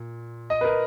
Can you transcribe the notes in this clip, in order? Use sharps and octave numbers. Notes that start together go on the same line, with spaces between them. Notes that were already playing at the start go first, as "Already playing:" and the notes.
Already playing: A#2
D#5
B4
A#4